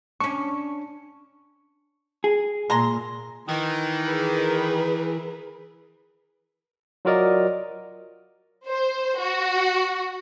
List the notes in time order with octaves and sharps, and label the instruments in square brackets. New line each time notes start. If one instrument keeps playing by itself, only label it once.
[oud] C#4 D4 [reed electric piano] C#6
[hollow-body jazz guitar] G#4
[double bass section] A#2 [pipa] G#3 A#5 C6
[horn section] D#3 [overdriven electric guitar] E3
[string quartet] G#4 A#4 B4
[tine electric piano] F#3 F4 F#4 A#4 D5 D#5
[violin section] C5
F#4